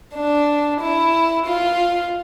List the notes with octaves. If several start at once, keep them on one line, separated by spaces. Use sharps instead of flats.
D4
E4
F4